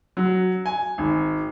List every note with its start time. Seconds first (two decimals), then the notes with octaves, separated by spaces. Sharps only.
0.17 F#3
0.66 G#5
0.98 G#1